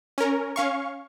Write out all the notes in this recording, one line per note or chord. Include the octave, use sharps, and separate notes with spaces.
C#4 A#4
C#4 F5 C#6